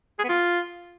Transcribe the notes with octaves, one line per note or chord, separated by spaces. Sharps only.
G#4
B3
F4